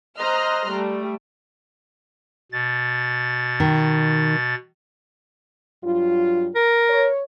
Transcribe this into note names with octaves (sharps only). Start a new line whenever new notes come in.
C5 D#5 A#5 C6 F6 F#6
G3 A3
B2 A6
D#3
G2 F#3 F4
A#4
C#5